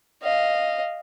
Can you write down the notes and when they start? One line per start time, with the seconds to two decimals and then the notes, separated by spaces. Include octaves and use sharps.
0.22 D#5 F5